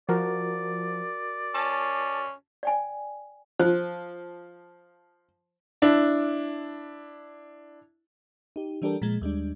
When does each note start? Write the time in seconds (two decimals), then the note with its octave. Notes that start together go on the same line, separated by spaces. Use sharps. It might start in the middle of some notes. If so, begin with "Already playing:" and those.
0.09 F3 F#4 A#4 D5
1.55 C#4 A5
2.63 D5 G5 G#5
3.59 F3 C5
5.82 D4 E4
8.56 D#4 G4
8.82 E3 G3 D4 G4 A4 A#4
9.02 A#2 F3 G#3
9.21 D#2 G3 G#3 D4